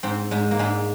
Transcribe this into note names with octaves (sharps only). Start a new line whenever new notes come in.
G#2 C4
G#2 G#3
A#3
G#2 G#3